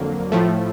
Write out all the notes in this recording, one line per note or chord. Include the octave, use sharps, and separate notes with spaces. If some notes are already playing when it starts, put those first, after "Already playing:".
Already playing: F2 D3 F#3 A#3
A2 F3 A3